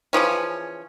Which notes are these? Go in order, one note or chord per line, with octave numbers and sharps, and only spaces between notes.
C#3 E3 F3 C#4